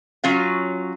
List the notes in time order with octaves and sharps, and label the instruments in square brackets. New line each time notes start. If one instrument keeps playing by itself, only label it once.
[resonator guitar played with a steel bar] F#3 C#4 F4 F5